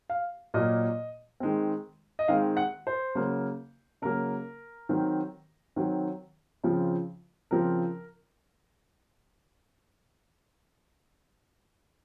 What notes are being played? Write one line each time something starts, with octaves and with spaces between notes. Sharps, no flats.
F5
A#2 F#3 A#3 D#5
D#3 G#3 C4
D#5
D#3 G#3 C4 F5
F#5
C5
C#3 F#3 A#3
C#3 F#3 A#3 A#4
D#3 F#3 C4
D#3 F#3 C4
C#3 F3 C4
C#3 F3 C4 A#4